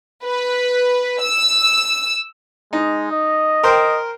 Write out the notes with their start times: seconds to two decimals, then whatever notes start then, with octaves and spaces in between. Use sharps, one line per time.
0.24 B4
1.21 E6
2.73 G#3 D#4
3.11 D#5
3.63 A#4 C5 G5